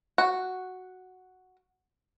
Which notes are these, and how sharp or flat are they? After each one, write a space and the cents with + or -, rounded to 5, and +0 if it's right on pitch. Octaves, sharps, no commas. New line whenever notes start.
F#4 +0 F#5 +0